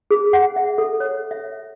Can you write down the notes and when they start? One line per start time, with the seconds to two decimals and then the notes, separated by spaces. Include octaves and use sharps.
0.11 G#4
0.33 F#5
0.56 E5
0.78 A4
1.00 C#5
1.31 E5